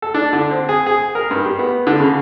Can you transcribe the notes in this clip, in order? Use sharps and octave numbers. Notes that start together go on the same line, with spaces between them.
A4
D4
D3
C4
G#4
G#4
A#4
G2
G4
B3
D3
C#3